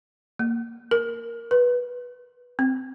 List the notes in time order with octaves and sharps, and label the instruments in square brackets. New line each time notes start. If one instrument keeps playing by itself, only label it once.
[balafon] A#3
A#4
B4
C4